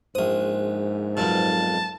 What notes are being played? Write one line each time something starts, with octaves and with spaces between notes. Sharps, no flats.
A#1 G#2 C5 D#6
B1 F2 A#2 A5